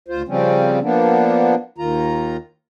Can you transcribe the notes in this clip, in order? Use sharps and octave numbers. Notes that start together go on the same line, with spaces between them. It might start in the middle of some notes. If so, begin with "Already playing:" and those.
D2 F4 C5
C#3 F3 G3 C4 C#4
F3 A#3 B3 D4
D#2 D#3 F4 A#5